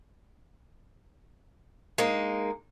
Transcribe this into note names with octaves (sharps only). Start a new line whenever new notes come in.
G#3 A#3 D#4